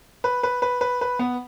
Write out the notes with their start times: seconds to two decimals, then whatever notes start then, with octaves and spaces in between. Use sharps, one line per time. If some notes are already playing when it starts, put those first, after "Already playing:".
0.24 B4
0.43 B4
0.62 B4
0.81 B4
1.01 B4
1.19 B3